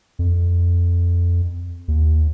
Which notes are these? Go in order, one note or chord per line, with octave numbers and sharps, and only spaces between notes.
F2
D#2